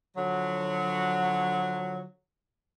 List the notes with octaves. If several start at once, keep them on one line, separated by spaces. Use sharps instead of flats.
D3 F3 F#3